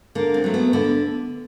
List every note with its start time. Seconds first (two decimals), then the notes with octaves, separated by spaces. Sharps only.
0.15 D3 A#3
0.34 C4
0.44 F#3 A3
0.54 B3
0.73 D3 B3